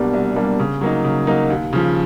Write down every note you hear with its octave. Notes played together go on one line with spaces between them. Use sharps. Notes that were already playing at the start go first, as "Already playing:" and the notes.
Already playing: C2 B2 G3 A#3 D4
C2
B2 G3 A#3 D4
C#3
F#3 A#3 D#4
C#3
F#3 A#3 D#4
D#2
C#3 F3